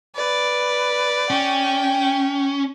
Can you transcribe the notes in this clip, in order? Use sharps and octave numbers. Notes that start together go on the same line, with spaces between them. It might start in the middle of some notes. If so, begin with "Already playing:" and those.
B4 D5
C#4 G5